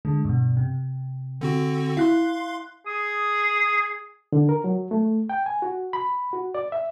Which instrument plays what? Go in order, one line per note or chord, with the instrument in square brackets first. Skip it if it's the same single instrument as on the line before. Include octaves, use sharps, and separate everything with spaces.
[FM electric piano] D3 G#3
G2 B2
C3
[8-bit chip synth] D3 C4 F#4
[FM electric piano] E4 F#6 [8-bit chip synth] F5 C6
[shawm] G#4 [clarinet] D#6
[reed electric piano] D3
A#4
F#3
A3
G5
G#5
F#4
B5
F#4
D5
E5